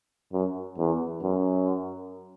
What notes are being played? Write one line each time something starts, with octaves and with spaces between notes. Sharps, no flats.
F#2
E2
F#2